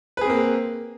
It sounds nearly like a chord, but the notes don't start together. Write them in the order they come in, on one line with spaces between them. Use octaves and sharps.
B4 G#4 C4 A#3